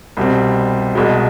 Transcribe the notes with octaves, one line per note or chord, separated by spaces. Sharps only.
C2 B2 G3 C4
C2 B2 G#3